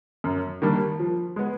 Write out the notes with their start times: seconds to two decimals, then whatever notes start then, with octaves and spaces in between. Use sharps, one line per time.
0.24 F#2
0.62 D#3 G3 A#3 D4
0.99 F3
1.36 G#3 B3